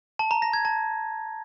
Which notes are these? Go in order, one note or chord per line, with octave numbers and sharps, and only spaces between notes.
A5
A#5
A#6
G#6
A5